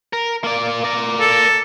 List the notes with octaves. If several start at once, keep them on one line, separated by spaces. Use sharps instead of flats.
A#4
A#3 D5
A#4 D5
A4